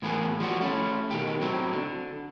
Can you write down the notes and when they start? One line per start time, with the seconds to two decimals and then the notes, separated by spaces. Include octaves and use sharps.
0.02 A2 E3 A#3 B3 G#4
0.40 F3 G3 F#4
0.61 A3 C#4 E4
1.11 B2 D#3 G4
1.41 F#3 C4 E4
1.73 D3